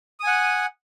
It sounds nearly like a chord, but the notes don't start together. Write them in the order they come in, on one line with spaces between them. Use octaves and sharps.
D#6 G#5 F#5